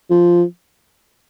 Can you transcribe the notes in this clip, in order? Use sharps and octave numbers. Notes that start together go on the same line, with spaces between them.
F3